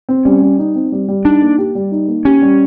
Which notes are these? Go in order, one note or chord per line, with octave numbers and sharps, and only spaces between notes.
C4
G3 C#4
G3
D#4
C4
G3
G3
D4 D#4
A#3
G4
G3
D#4
A#3
C#4 G4
G3